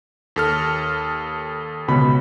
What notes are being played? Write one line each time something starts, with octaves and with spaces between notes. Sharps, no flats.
D#2 A4 F6
C#2 B2 B5